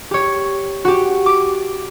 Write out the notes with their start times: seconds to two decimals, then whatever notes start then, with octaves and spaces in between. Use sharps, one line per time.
0.11 G4 C#5
0.85 F#4 G4
1.26 D6